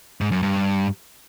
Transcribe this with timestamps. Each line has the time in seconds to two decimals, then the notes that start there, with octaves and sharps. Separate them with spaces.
0.21 G#2
0.32 F#2
0.43 G2